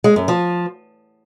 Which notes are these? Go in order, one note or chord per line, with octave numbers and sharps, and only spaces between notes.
G#3
F#2
F3